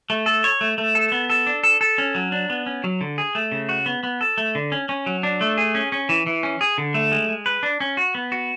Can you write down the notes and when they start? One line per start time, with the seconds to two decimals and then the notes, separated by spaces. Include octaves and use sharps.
0.10 A3
0.26 A4
0.44 C#5
0.61 A3
0.78 A3
0.95 A4
1.12 B3
1.30 A4
1.47 D4
1.63 A4
1.81 A4
1.98 C#4
2.15 F#3
2.32 D4
2.50 B3
2.66 C#4
2.84 F#3
3.01 D3
3.18 G#4
3.35 A3
3.52 C#3
3.69 F#4
3.86 B3
4.03 B3
4.21 A4
4.38 A3
4.55 D3
4.72 C#4
4.89 C#4
5.06 F#3
5.23 D4
5.41 A3
5.58 G#4
5.75 C#4
5.92 C#4
6.09 E3
6.26 E3
6.43 C#4
6.61 G#4
6.78 D3
6.94 A3
7.12 G#3
7.29 G#3
7.46 B4
7.63 D4
7.80 C#4
7.97 F#4
8.15 B3
8.32 F#4